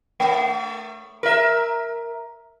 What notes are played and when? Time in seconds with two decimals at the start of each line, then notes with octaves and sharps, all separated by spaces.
0.20 A3
1.23 A#4 E5